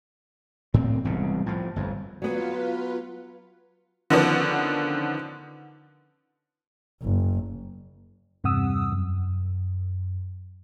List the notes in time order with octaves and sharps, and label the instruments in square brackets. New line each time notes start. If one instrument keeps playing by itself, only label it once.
[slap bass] A2 C4
E1 C2 A2 C#3
A2 F3
G1 F2
[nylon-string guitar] F#3 B3 [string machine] F4 B4
[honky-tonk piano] D3 D#3 F3 B3 C#4 D4
[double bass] F#1
[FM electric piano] E2 G2 C3 F#5 D#6 E6
F#2